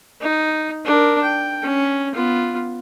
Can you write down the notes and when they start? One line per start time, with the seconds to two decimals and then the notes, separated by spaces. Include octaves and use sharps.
0.21 D#4
0.85 D4 A#4
1.22 G5
1.63 C#4
2.14 B3 F4